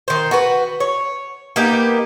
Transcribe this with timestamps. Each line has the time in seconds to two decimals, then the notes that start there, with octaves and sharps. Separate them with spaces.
0.08 D#3 C5
0.31 F#4 B4
0.80 C#5
1.56 A#3 B3 D#4 G4